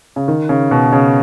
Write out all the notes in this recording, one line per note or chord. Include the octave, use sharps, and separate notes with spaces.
C#3
D#3
C#3
B2
C#3